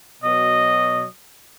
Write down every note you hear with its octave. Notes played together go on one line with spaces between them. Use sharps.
B2 F#3 D#5